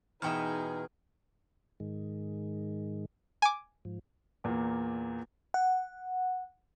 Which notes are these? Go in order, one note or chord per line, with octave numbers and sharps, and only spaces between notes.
E2 B2 D#4 G#4 E5 G5 F6
G#2 D#3 G#3
G#5 D6
G#2 F3
E2 A#2 A#3
F#5